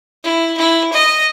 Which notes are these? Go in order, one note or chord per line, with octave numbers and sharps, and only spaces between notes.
E4
E4
D#5